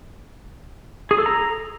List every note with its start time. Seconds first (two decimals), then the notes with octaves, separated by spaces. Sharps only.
1.11 G#4
1.18 A4
1.26 A#5